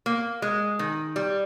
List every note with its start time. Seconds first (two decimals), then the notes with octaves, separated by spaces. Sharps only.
0.06 A#3
0.42 G#3
0.79 D#3
1.16 G3